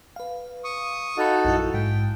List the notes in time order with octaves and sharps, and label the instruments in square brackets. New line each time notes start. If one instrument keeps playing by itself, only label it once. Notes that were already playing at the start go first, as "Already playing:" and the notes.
[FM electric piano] B4 F5
[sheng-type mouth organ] C#6 D#6
[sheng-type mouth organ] D#4 F#4 A4 [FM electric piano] F5 B5
[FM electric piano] A#1 F#2 E4
[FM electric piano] G#2 [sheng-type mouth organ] G5